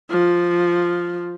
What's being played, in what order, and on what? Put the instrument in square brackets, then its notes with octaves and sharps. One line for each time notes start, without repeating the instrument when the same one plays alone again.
[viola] F3